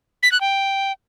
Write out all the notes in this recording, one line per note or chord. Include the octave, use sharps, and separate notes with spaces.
B6
F#6
G5